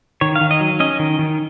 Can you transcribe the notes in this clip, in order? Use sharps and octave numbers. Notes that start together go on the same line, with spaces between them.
D#3 C#5
F5
D#3
D#5
F#3
C#4 D#5
D#3
D#3